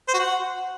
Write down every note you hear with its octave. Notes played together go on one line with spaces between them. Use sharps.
C5
F#4
F#5